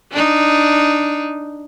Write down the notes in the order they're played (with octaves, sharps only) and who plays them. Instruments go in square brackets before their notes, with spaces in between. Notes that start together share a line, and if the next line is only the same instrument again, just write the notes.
[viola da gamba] D4 D#4